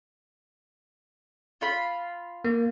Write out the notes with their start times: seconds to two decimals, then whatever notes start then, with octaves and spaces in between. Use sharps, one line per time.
1.61 F4 F5 B5
2.44 A#3